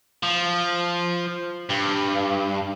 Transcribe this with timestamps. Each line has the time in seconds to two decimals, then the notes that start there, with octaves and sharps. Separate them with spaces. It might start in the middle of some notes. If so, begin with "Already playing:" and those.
0.23 F3
1.69 G2